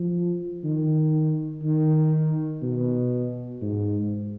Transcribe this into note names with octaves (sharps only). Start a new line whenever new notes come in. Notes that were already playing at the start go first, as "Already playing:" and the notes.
Already playing: F3
D#3
D#3
B2
G#2